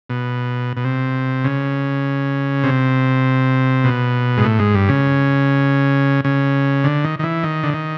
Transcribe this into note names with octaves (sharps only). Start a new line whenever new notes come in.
B2
B2
C3
C#3
C3
B2
G#2
A2
G#2
G2
C#3
C#3
D3
D#3
D#3
E3
D#3
D3
D#3